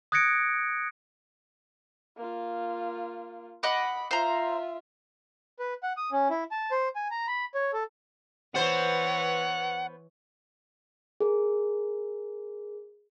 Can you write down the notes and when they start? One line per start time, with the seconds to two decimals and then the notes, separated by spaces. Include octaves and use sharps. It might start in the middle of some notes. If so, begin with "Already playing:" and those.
0.12 D#6 F#6 G#6 A#6 C#7 D7
2.17 A#3 F4
3.63 D#5 F#5 B5 D6
4.11 F4 C5 E5 A#5
5.59 B4
5.83 F#5
5.97 D#6
6.12 C#4
6.30 E4
6.51 A5
6.71 C5
6.96 G#5
7.11 A#5
7.27 B5
7.55 C#5
7.73 A4
8.55 E3 B3 C5 C#5 F#5
11.20 G#4 A#4